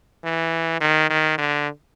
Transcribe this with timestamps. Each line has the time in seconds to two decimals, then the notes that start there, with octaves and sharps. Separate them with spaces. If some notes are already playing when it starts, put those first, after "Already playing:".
0.24 E3
0.81 D#3
1.10 D#3
1.38 D3